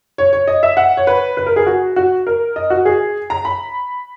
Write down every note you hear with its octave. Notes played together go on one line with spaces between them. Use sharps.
C#5
C#5
D#5
E5
F#5
C#5
B4
B4
A#4
G#4
F#4
F#4
A#4
D#5
F#4
G#4
A#5
B5